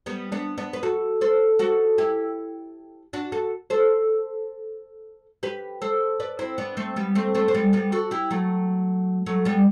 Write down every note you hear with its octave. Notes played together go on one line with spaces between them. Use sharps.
G3 B3
B3 D4
B3 D4
B4
F#4 A4
A4 C5
F#4 A4
E4 G4
D4 F#4
F#4 A4
A4 C5
G4 B4
A4 C5
B4 D5
C4 E4
B3 D4
A3 C4
G3 B3
A3 C4
A3 C4
C4
G3 B3
G3 B3
F#4 A4
E4 G4
F#3 A3
F#3 A3
G3 B3